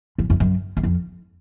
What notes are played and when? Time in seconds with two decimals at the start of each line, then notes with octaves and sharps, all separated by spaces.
0.18 F2
0.30 F#2
0.40 F#2
0.77 E2
0.83 F2